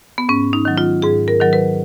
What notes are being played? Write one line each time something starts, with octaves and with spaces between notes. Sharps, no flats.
B3
G#2 C#4
D#4
D#3 F#3
F4
G#2 G#4
A#4
D#3 F#3 A#4
B4